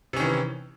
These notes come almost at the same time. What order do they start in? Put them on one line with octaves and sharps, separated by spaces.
C3 C#4 D#3 E3